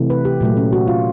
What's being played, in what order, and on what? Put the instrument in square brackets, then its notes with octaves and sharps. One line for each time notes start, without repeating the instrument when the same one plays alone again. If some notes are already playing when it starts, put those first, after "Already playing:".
Already playing: [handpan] C3 E3 A3
B4
G4
A#2 F#3 A3
C#4
F#4
F4